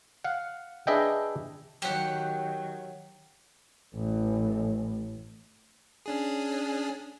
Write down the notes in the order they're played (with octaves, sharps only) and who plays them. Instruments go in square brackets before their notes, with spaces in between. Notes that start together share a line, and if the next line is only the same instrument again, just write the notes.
[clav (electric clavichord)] F5 F#5
D4 G#4 B4 D#5 E5 G5
[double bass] D#3 F#3 [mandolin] G4 F#5
[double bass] A1 A2
[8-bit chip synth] C#4 D4 G#4